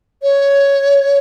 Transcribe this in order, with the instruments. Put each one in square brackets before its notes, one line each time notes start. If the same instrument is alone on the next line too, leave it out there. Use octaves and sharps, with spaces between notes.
[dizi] C#5